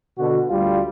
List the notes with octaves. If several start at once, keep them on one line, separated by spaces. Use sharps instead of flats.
B2 D3 F#4
D2 G3 F4